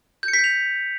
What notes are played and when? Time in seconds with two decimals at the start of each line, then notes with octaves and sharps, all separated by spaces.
0.23 G6
0.28 C#7
0.33 B6
0.39 G6
0.44 F7